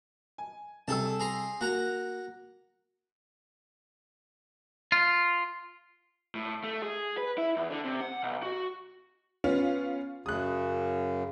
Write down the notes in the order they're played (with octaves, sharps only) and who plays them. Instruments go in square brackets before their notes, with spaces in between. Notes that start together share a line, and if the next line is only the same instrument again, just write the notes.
[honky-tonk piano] G#5
[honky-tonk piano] C3 G3 E6 [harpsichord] G#4 A4 A5
[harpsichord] G#4 A#5 C6
[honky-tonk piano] A#3 [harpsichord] F#4 F#5 A#5
[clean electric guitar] F4
[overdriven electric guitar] A2
A3
G#4
B4
E4
E2
D3
C3
F#5
B1
F#4
[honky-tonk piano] B3 C#4 F4
[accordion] F#2 C#3 [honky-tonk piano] D#6 F#6